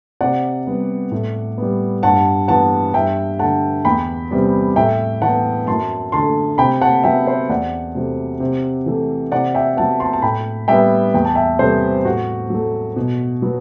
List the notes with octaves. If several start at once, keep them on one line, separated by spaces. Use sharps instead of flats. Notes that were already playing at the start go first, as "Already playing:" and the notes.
C3 D5 F#5
G3 B3
A2
G3 B3
G2 F#5 A5
E3 B3 F#5 A5
G2 E5 G5
D3 A3 F#5 A5
E2 G5 B5
C3 G3 B3
A2 E5 G5
E3 B3 F#5 A5
F#2 A5 C6
D3 A3 A5 C6
C3 G5 B5
F#5 A5
F#3 B3 E5 G5
C5 E5
E2 D5 F#5
C3 F#3 A3
C3
E3 A3
C3 D5 F#5
E5 G5
F#3 B3 F#5 A5
A5 C6
A5
A2 G5 B5
G3 B3 E5 G5
E2 G5
A5
E5 G5
C3 G3 B3 A4 C5
A2 F#4
F#3 A3
B2
F#3 B3